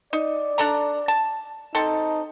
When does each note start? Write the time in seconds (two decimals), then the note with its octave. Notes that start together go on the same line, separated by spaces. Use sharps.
0.13 D#4 D5
0.58 D4 A4 A#5
1.08 A5
1.75 C4 D#4 A4